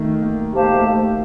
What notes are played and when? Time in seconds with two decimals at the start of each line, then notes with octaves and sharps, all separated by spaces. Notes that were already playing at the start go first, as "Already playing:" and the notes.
Already playing: D#3 A3
0.22 A#3
0.52 A3 G4 C5 F5 A5
0.63 A#3
0.72 A3